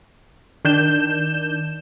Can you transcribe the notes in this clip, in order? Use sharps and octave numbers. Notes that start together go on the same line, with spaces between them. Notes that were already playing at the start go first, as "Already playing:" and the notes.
D#3 D4 G6 E7